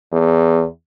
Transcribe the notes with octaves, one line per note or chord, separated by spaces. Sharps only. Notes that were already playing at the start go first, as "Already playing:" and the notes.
E2